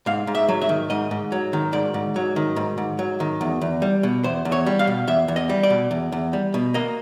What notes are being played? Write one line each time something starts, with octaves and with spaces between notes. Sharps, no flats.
G#2 F5
G#2
E5
F#3
E5
D#3
G#2 D#5
G#2
F#3
D#3
G#2 D5
G#2
F#3
D#3
G#2
G#2
F#3
D#3
E2
E2
G3
B2
E2 C5
E2
C#5
G3
F5
B2
E2 E5
E2
D#5
G3
D5
B2
E2
E2
G3
B2
A#3 D#5